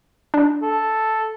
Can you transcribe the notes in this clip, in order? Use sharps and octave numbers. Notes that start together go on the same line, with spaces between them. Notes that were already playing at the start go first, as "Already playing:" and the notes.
D4
A4